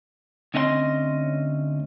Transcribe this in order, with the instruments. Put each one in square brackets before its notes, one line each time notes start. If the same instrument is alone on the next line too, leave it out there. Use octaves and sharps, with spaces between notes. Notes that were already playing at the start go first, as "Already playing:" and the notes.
[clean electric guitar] D2 C4 C#4 D#5 F5 C6